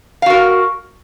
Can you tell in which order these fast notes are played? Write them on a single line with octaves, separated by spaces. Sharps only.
F5 F#4 A#4